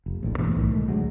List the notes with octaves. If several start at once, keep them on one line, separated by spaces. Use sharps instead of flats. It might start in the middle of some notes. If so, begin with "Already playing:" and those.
F1
A#1 A2
G2 B2 E3 A3
B1 A2 D#3
G#3 A3
D2 F#3 G#3